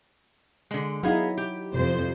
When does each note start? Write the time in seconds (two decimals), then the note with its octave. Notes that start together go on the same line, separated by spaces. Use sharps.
0.71 D3 G#3
1.03 F#3 B3 D#4 E4 G#4 F5
1.37 G4
1.74 F2 C3 C5